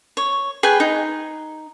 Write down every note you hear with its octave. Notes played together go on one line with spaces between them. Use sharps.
C#5
G#4 B4 G5 G#5
D#4